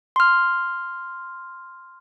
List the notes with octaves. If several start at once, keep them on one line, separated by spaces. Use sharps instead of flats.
C6 F6